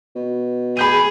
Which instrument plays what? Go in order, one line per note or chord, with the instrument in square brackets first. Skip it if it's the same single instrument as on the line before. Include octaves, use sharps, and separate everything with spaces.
[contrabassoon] B2
[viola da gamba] G#4 [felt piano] B5 G6 D#7